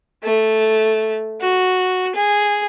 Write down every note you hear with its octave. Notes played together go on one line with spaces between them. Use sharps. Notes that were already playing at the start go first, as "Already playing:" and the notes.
A3
F#4
G#4